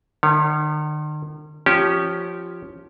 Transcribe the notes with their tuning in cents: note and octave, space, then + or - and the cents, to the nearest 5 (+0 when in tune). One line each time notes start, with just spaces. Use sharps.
D#3 -45 C#5 +0
F3 +0 C#4 +10 G4 -20